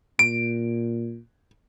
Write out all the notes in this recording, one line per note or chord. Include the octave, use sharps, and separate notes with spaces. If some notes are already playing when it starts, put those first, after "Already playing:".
A#2 D7